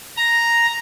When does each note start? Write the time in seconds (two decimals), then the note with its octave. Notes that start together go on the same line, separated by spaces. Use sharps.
0.17 A#5